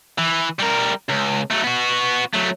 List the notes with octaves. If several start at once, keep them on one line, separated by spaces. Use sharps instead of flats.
E3
G3 A#4
C#2
F#3 A3
B3 F#4
F#3 A3